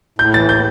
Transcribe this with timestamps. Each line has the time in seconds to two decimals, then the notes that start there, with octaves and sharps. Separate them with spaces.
0.19 A2 G6
0.34 E3 A6
0.49 A2 G6